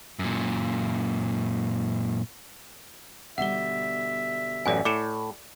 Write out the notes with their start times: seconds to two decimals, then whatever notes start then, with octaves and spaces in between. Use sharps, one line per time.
0.19 F#2 A#2
3.38 B2 D3 G3 E5 F#5 G7
4.66 A1 F#2 D5 G#5
4.85 A2 D6 C#7 E7